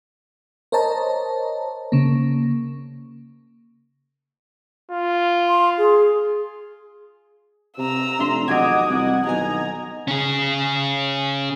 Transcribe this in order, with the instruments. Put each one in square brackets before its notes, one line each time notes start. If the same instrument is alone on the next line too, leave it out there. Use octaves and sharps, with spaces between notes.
[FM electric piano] A#4 C5 C#5 D#5 A5 A#5
C#3 A#3
[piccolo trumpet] F4
[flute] C6
G#4
[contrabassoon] C3 [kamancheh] A#5 E6
[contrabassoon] F1 [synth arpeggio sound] D4 C6 [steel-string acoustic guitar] E5
[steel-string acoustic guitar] E2 F#3 F#4 [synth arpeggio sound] D#5 G#6 [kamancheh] D6 D#6
[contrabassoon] C2 [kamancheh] F#5
[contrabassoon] B1 [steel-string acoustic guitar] D#3 F#3 G#5 [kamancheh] A#5
[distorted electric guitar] C#4 G#4